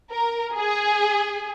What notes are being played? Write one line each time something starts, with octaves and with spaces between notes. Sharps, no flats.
A#4
G#4